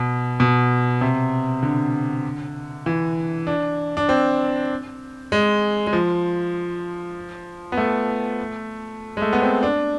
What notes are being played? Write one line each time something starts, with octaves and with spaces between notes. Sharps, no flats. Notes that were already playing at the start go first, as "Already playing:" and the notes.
Already playing: B2
B2
C3
D3
E3
D4
D4
C4
G#3
G#3
F3
B3
A3
G#3
A3
B3
C4
D4